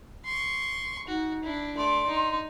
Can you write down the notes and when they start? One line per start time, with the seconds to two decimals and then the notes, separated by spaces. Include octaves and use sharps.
0.25 C6 C#6
1.07 D#4 F#4
1.43 D4 E4
1.77 A3 D5 C6
2.07 D#4